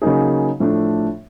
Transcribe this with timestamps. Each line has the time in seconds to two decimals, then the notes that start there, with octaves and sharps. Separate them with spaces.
0.02 C#3 F#3 A#3 D#4 G#4
0.60 A2 F3 A3 D4